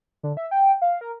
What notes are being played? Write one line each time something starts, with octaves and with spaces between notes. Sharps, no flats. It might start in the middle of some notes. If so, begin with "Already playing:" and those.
D3
E5
G5
F5
A#4